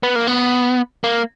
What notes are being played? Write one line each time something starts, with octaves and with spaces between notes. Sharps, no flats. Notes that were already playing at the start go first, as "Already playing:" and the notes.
B3
A#3
B3
A#3